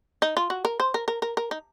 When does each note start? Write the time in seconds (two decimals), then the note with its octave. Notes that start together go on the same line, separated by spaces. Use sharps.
0.22 D#4
0.37 F4
0.50 F#4
0.65 A#4
0.80 C5
0.94 A#4
1.08 A#4
1.22 A#4
1.37 A#4
1.51 D#4